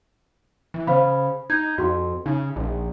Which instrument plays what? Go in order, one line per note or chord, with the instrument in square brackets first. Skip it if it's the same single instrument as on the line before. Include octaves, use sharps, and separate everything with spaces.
[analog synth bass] E3
[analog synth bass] C#3 [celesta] C5 F5 B5
[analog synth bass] D#4 [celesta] G6 G#6
[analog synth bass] F2 [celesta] F#4 C6
[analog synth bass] C#3 [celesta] D#4
[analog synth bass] A#1